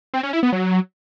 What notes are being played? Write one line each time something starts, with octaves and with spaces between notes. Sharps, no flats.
C4
C#4
E4
B3
F#3